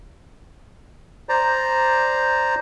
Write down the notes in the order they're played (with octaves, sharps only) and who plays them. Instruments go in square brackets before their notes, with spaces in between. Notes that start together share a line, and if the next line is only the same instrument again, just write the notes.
[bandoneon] C5 D5 A#5